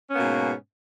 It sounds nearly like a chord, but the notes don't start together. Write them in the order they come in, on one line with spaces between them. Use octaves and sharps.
C#4 B3 A#3 B2 G#2